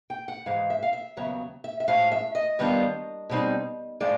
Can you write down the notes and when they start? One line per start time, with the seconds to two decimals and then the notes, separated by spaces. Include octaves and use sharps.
0.10 G5
0.28 F#5
0.46 G#2 E3 G#3 F5
0.70 E5
0.83 F5
0.93 E5
1.17 D#2 C#3 F#3 B3
1.64 E5
1.80 E5
1.88 A2 F3 G#3 C#4 F4 F5
2.12 E5
2.35 D#5
2.59 D#3 G3 B3 D4 F4
3.30 B2 G3 C4 D#4
4.00 A2 F3 G#3 D5